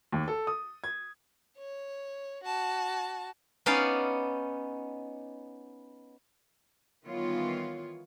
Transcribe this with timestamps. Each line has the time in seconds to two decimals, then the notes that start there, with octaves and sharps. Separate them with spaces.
0.12 D#2
0.28 A4
0.47 D#6
0.84 G#6
1.58 C#5
2.44 F#4 A5
3.66 B3 C#4 D#4 D5 F5
7.06 D#3 E3 G3 B3 F4 C#5